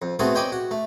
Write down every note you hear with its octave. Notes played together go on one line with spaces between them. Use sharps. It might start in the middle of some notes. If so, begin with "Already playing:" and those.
F2
A3 B3 C4 F#4 G#4 A4
C#5 D#5 G5 G#5 B5 D6
F#4
A3